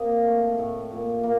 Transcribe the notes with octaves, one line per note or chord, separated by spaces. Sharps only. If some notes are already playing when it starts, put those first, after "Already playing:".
Already playing: C3 A#3 A#4 D#5
A3
A2
A#2
A#3